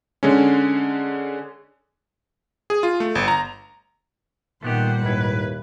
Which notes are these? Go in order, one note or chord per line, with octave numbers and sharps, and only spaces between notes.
D3 G#3 C#4
G#4
F4
A3
G1
A#5
A#2 D#3 G3 A3 B3 G4 C5 F#5
D#2 G#2 E4 B4